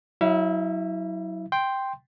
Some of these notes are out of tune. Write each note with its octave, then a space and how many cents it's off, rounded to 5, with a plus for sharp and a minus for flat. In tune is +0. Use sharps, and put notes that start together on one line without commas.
F#3 +0 E4 -25 E5 +40
G5 +0 C6 +0